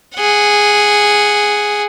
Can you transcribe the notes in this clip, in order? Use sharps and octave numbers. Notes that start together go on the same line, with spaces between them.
G#4 F#5